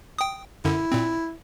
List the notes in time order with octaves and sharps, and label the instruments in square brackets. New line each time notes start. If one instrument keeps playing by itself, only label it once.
[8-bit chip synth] G5 D#6
[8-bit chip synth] F#2 D3 [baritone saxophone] E4
[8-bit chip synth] A#2 C4